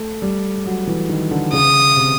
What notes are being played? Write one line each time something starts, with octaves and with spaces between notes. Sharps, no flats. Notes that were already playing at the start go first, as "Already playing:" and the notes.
Already playing: A3
G3
F#3
E3
D#3
D3
C#3 D#6
C3